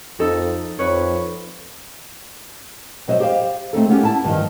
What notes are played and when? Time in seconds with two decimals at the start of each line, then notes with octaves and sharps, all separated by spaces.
0.19 F2 D#4 A4
0.79 F2 B4 C#5
3.08 B2 F#3 C5 D#5 E5
3.20 G4 C5 F5
3.73 A3 C4 D#4 A4
3.88 A#3 B3 C#4 G4
4.03 E4 A5
4.24 G2 D#3 F3